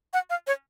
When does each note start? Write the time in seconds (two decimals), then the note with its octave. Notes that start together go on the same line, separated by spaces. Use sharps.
0.13 F#5
0.30 F5
0.47 C#5